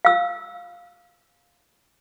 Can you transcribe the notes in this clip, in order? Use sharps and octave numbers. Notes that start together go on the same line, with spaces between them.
F5 E6